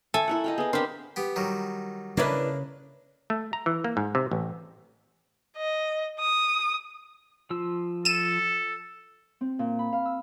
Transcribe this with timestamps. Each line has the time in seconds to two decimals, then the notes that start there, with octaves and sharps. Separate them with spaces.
0.14 A3 A4 G#5 A5
0.28 E4 A#4 F#5
0.44 D#5 F5 G5
0.58 B3 G#4 D#5
0.73 B3 C4 D4 G4 A#4 C5
1.16 B3 G4
1.36 D#3 F#3 G3
2.17 C#3 A#3 D4 E4 B4
3.30 A3
3.53 A#5
3.66 E3
3.84 A#3
3.97 G#2
4.15 C3
4.31 A1
5.57 D#5
6.20 D#6
7.50 F3 F4 E6
8.05 A4 D#7 E7
9.41 C4
9.59 A#2
9.79 B5
9.93 F5
10.05 E6